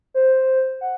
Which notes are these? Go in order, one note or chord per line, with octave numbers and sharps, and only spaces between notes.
C5
F#5